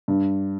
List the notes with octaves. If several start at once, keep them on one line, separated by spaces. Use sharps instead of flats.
G2